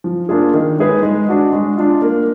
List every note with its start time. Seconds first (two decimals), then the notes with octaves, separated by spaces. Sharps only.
0.04 F3
0.29 A#3 D4 F4 G#4
0.54 D#3
0.78 G#3 D#4 G#4 B4
1.03 G#3
1.29 D4 F#4
1.53 G#3
1.77 D4 F4
2.02 A#3